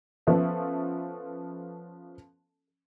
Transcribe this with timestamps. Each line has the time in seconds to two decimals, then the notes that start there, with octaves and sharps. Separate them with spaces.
0.27 F3 B3 C#4 A4 E5